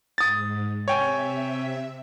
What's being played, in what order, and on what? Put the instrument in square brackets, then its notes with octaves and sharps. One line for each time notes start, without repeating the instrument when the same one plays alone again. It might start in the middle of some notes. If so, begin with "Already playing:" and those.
[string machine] G#2 [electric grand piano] D#6 A6
[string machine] C3 E5 [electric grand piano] C#5 G5 G#5